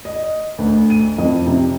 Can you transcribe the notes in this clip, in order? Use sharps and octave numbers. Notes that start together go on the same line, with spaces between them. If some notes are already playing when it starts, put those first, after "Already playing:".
D#5
D2
D#7
F2
C3